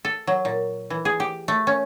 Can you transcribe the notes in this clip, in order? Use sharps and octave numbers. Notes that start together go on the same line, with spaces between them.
A4
F#3
A#2
E3
G#4
G4
A3
C#4